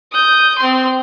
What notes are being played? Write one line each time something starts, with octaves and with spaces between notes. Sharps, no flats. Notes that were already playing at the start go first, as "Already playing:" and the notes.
D#6 G6
C4 C6